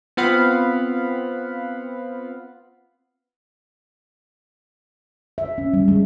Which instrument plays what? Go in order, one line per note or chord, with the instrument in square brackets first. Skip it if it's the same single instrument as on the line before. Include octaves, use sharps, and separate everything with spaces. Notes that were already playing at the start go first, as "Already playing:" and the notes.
[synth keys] B3 C4 F4 F5 F#5 B5
[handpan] E5
C#4
G3
G#3